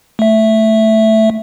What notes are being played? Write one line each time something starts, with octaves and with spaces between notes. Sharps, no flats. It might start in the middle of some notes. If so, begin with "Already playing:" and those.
A3 E5